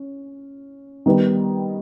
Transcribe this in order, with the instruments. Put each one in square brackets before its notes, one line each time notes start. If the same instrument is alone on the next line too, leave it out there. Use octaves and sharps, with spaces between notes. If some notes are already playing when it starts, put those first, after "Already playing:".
Already playing: [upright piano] C#4
D#3 G3 B3